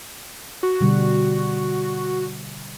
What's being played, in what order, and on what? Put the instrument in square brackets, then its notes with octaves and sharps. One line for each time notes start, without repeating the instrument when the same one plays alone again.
[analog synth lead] F#4
[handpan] B2 D3 G3